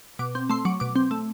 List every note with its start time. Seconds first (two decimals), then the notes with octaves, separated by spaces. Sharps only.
0.19 B2 D6
0.35 C4
0.50 A3 C6
0.65 F#3 D6
0.80 B2 D6
0.96 C4
1.11 A3